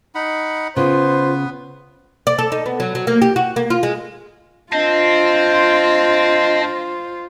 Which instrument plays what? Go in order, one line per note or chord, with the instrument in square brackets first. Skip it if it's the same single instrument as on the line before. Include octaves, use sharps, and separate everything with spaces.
[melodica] D#4 F#5 B5
[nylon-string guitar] C#3 [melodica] B3 B4 [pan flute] F4 [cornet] C5
[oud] D5
A4
D#4
B3
F#3
F#3
A#3
G4
F#4
A#3
F4
G#3
[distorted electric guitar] C4 [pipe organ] D4 D#5 [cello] F4 C5